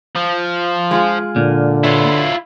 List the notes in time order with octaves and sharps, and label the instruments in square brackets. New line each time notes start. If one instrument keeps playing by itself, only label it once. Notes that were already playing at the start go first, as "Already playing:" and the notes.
[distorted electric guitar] F3
[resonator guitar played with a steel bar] G#3 F4 G#4
[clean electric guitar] A#2 [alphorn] D3
[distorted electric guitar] E4 F4 [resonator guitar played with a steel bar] B4 C#5